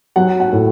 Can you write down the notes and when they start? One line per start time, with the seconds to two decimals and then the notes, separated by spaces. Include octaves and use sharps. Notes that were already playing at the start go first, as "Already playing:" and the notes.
0.16 F#3 F#5
0.40 F#5
0.52 A2